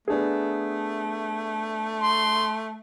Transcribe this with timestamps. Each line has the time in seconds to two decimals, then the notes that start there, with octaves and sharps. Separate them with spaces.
0.08 A3 B3 D4 G#4
2.02 C6